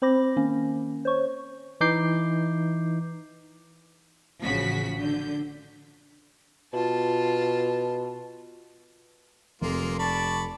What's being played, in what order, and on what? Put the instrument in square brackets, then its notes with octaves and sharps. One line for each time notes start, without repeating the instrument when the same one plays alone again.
[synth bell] C4 C5 B5 D6 A#6
D#3 A#3 C#4
C5 C#5 C#6
[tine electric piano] E3 D#4 D6 G6 C7
[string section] A1 C#3 F3 F#4 B6
D3 G6
[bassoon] B2 [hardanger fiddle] F4 A5
[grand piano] F1 [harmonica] G#3 A#3 F4
[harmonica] D5 B5 C#6 [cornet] A5